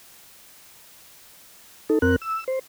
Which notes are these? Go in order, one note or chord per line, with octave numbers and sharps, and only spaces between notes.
D#4 A4
F2 C4 A#4 F#6
E6
C5